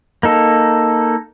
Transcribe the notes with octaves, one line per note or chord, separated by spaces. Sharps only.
A#3 D#4 A4